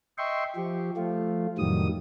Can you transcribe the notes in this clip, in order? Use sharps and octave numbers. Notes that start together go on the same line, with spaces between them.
D#5 E5 G5 C6 C#6
F3 G4
F3 A3 F4
F2 A2 D#3 F#3 G3 D#6